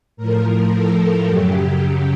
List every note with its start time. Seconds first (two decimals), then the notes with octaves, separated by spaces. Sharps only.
0.17 A2 F3 A#4
0.72 A4
1.27 F#2 C#3 F#3 G4
1.82 G4